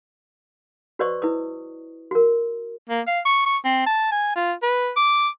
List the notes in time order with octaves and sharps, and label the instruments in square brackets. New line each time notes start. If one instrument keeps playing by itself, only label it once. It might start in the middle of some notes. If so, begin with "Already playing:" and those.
[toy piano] F#4 B4 C5 D5 D#5 C#6
E4 B4 D#6
F#4 A#4
[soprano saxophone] A#3
F5
C#6
C#6
C4
A5
G#5
F4
B4
D6